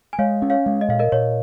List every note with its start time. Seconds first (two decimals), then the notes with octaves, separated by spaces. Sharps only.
0.13 G#5
0.18 G#3 C#5 F5
0.42 C#4
0.50 C#5 F5
0.66 G#3
0.81 D#5
0.88 A#2 F5
0.99 A#4 D#5
1.12 A#2 C#5